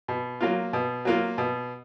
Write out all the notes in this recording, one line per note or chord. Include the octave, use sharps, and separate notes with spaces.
B2
F#3 A#3 F4
B2
F#3 A#3 F4
B2